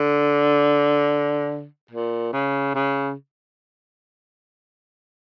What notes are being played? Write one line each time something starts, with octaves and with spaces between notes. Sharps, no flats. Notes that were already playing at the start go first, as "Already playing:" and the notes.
Already playing: D3
A#2
C#3
C#3